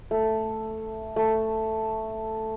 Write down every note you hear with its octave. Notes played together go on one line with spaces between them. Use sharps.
A3
A3